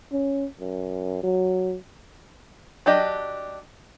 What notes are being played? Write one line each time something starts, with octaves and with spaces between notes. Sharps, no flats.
C#4
F#2
F#3
F#3 D4 G4 D#5